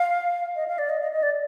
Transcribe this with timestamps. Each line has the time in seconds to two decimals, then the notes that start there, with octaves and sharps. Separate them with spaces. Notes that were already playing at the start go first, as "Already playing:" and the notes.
Already playing: F5
0.56 D#5
0.68 F5
0.78 D5
0.89 D#5
1.01 D#5
1.12 D#5
1.23 D5